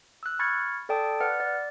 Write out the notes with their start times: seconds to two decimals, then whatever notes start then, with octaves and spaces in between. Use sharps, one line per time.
0.23 E6 F#6
0.39 B5 C#6 F6 G#6 A6 C#7
0.89 A4 D5 G5 A5 D#6
1.20 B4 D5 F#5 F6
1.40 D5